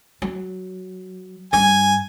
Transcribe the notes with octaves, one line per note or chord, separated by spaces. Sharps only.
F#3
G2 G#5